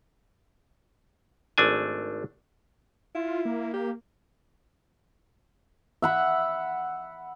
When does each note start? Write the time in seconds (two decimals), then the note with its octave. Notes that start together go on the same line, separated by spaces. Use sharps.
1.58 G#1 A3 D4 G#5
3.15 E4 F4
3.45 A#3
3.74 G4
6.02 E5 F#5 B5